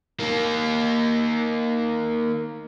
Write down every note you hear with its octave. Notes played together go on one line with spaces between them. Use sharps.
A#3 D#4